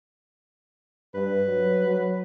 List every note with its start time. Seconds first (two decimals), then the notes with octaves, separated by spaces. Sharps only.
1.14 G2 B4
1.47 F#3
1.87 F#3